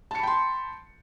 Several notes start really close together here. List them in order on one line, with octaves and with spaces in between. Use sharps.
A5 C#7 B5 G5 C6